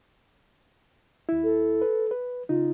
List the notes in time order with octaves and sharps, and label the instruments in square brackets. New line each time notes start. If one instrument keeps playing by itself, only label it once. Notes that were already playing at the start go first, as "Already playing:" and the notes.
[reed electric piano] D#2 E4
[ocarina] A4
[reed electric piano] B4
B4
[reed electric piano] C#3 D#4 [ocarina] F4